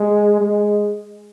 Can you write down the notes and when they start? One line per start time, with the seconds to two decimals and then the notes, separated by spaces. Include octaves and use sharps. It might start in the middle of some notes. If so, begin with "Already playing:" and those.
Already playing: G#3
0.41 G#3